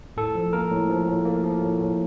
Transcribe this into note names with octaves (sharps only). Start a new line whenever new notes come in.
A2 A4
F3
A#3 A#4
A2
F3
A2
A#3
F3
A2
A2